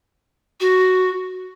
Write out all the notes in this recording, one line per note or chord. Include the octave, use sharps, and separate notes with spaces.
F#4